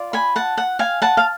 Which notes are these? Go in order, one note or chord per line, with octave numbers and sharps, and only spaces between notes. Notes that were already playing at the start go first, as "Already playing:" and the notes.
Already playing: F4 D5
G#5 B5
F#5 A5
F#5
F5 G#5
F#5 A5
F5